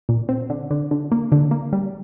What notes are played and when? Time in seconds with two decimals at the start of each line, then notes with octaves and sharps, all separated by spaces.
0.09 A#2
0.29 C4
0.50 D3
0.71 D3
0.91 D3
1.12 A#3
1.32 D3
1.51 A#3
1.73 G3